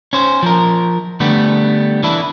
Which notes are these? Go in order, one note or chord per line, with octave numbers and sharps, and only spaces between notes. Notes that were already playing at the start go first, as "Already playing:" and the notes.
C#4 C5
F3 A#4
D3 G3 A3 B3
E3 D4 E4